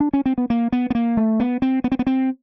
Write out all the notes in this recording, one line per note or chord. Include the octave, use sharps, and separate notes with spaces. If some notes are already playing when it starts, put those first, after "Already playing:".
D4
C#4
C4
B3
A#3
B3
B3
A#3
A3
B3
C4
B3
C4
B3
C4